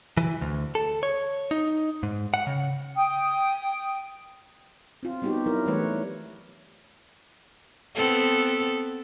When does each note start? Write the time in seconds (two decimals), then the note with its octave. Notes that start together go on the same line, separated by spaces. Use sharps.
0.17 E3
0.41 D2
0.75 A4
1.03 C#5
1.51 D#4
2.03 G#2
2.34 F#5
2.47 C#3
2.95 G5 D#6
5.03 C4 F4
5.22 G3 B3 D#4 F#4 G4
5.46 F#3 E4 A#4
5.66 E3 G3 A3 B4 C#5
7.95 B3 C4 A4